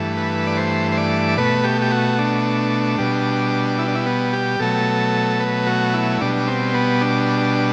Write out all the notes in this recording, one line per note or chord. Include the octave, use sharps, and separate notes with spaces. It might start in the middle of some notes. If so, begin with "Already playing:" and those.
Already playing: G2 E3 A3
B4
D5
C5
C5
D5
B2 A3 B4
G4
G4
F#4
D4
B2 G3
E4
D4
E4
B3
G4
B2 F#3 A3 A4
B4
F#4
E4
B2 G3 D4
C4
B3
D4